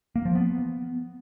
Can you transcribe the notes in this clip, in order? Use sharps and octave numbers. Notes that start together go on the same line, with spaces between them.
A#3
F3
B3